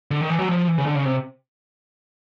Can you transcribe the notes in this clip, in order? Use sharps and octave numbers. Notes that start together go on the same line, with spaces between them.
D3
D#3
E3
F#3
F3
E3
C#3
D3
C#3
C3